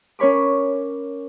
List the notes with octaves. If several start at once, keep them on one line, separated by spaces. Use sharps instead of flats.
C#4 A#4 C#5 B5 D6